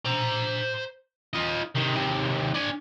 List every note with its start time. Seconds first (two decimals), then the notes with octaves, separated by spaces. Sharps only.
0.05 C5 A#5
1.33 F4 D#5
1.75 C3 D#3
1.96 D#2 C3
2.54 D4 G#5